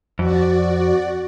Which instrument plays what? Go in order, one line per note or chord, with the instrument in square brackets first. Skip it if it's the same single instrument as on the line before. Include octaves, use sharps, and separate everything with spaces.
[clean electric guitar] F2 [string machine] F#4 D5